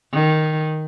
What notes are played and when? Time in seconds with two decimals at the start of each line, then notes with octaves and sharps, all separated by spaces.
0.13 D#3